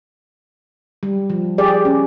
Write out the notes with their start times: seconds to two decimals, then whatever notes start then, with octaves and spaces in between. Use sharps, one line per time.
1.03 G3
1.30 F3
1.58 G4 G#4 D5
1.85 C#4